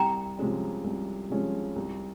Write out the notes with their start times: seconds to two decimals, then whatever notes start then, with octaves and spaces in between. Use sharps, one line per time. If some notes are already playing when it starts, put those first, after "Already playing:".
Already playing: C2 G5 A#5
0.39 C3 F3 G#3 C#4
0.84 C2
1.30 C3 F3 G#3 C#4
1.76 C2